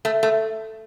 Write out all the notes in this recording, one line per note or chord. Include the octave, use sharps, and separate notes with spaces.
A3
A3